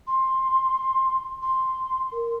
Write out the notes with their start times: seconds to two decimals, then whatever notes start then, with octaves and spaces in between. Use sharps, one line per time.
0.07 C6
1.42 C6
2.12 A#4